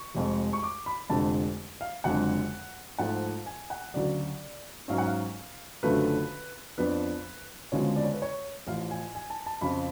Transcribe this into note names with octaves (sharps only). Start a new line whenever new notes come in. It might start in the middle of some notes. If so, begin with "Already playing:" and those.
Already playing: C#6
F1 F2 F3 G#3
C#6
D6
B5
F1 F2 D3 G#3 A5
F5
F#1 F2 D3 G#3 F#5
G#2 F3 A3 F#5
G#5
F#5
D2 C#3 F#3 D5
G#2 F#3 C#4 F5
F#5
F5
F#1 F#2 D3 F3 A3 B4
F2 F3 B3 D4 B4
D2 C#3 F3 G#3 B3 C#5
D5
C#5
B4
C#5
A1 A2 F3 F5
G#5
G#5
A5
A5
F2 C#3 F3 B5